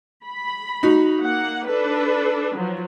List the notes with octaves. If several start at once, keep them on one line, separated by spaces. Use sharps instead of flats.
B5
D#4 F#4
A#3 F#5
D4 A4 B4
F3 F#3